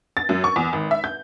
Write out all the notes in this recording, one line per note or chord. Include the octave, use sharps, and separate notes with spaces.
A6
F#2
C#6
E2
G#1
E5
G6